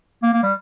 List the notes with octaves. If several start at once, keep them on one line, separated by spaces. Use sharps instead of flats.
A#3
A#3
G3